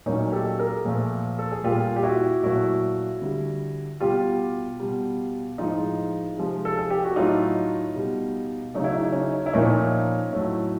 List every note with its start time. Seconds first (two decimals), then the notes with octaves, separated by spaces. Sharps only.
0.06 A#2 F#3 A3 C#4 D#4
0.32 G4 A4
0.58 G#4 A#4
0.85 A#2 F3 A3
1.39 A4
1.52 G#4
1.64 A#2 G3 F4 G4
1.96 G4
2.03 E4 F#4
2.44 A#2 F#3 A3 E4 F#4
3.22 D3 G3
4.00 B2 G3 F4 G4
4.80 B2 G3
5.58 A2 F3 G#3 D#4 F4
6.37 C3 F3 G#3
6.65 A4
6.78 G#4
6.90 G4
7.04 F#4
7.16 A2 F#3 A3 D#4 F4
7.96 B2 G3
8.74 C#3 F#3 A3 D#4
8.84 E4
8.94 D#4
9.03 E4
9.12 C#4 D#4
9.46 E4
9.53 A#2 F3 A3 C#4 D#4
10.33 A2 F#3 A3